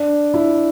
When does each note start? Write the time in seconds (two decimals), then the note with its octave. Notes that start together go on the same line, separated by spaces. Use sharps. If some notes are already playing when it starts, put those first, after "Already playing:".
Already playing: D4
0.34 E4